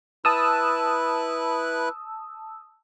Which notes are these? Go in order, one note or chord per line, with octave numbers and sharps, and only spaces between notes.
E4 B4 A5 D#6 E6 F#6